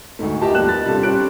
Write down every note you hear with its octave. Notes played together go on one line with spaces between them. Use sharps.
D2 G#2 A3
E4 G4 A#4 D#5 G5 A5
D#2 F3 G3 B3 F#6 E7
D#5 A5 A6
C3 G3 D4 F4 A4
G3 C4 C#4 G4 F#6 D7